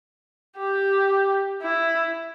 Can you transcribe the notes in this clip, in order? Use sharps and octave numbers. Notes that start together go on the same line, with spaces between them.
G4
E4